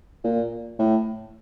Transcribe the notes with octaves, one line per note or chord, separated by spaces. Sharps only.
A#2
A2